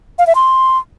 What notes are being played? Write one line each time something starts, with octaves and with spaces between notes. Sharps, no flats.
F5
E5
C6